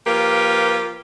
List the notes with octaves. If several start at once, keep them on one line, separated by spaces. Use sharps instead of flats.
F3 A#3 F4 G4 A#4 B4